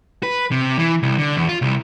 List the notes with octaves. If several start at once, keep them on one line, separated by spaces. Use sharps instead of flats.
B4
C3
E3
C2
D3
E2
F4
C2